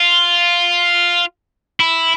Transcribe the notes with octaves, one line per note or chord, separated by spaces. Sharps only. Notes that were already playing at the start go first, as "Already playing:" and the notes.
Already playing: F4
E4